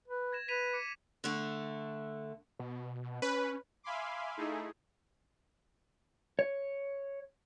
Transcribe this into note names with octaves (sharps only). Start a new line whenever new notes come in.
B4
G#6 A#6 E7
B4 B6 D#7 F7
D6 C#7
D3 A3
B2
C#4 B4
E5 F5 G#5 B5 C6 D6
A3 D#4 E4 G#4
C#5